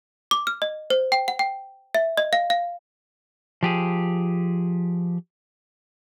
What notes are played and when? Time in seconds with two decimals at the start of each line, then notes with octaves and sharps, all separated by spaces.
0.31 D6
0.47 F6
0.62 D#5
0.90 C5
1.12 G5
1.28 F#5
1.39 G5
1.95 E5
2.17 D#5
2.33 F5
2.50 F5
3.63 F3 G4 G#4